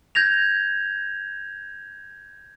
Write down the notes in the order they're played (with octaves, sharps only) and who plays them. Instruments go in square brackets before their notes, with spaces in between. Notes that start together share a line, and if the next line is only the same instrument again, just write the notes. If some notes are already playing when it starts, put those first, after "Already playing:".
[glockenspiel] G6 G#6 A#6 F7